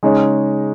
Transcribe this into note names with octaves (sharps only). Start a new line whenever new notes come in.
C#3 G#3 D#4 G#4 C#5